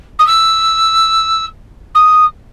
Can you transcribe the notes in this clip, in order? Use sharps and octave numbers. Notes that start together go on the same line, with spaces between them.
D#6
E6
D#6